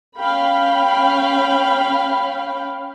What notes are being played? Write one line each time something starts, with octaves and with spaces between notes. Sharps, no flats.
C#4 F5 G5 B5